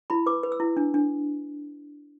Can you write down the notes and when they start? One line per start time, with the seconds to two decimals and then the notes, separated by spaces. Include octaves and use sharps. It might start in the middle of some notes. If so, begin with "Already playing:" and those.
0.10 E4 B5
0.26 B4 D6
0.43 B4
0.52 E6
0.60 E4
0.77 D4
0.94 D4